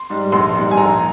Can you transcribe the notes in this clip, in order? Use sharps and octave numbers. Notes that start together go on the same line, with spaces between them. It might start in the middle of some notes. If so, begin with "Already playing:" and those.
Already playing: C6
G#2 G3
A#1 C6
G#2 G3
G#5
A#1 A#5